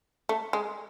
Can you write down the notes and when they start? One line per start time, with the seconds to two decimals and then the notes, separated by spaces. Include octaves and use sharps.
0.29 A3
0.53 G#3